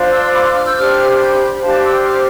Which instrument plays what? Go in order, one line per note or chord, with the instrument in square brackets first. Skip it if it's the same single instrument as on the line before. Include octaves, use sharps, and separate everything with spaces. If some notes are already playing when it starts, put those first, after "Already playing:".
Already playing: [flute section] D4 F4 C5
C6 E6
B5 D6
C6 E6
D6 F6
E6 G6
D4 G4 C5 D6 F6
G5 B5
D4 G4 C5 F5 A5
C6 E6
D6 F6